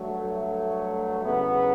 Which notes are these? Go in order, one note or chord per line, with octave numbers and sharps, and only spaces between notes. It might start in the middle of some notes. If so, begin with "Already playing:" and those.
Already playing: G2 F#3 A3
E2 C#3 F#3 B3